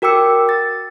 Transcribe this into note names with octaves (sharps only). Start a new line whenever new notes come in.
F#4 A#4 G5 D6 E6 C#7
A6